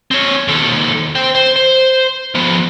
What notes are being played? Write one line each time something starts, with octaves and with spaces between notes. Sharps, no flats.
C4 C#5
D#2 A4
C5 G5
C5
C5
F3 B3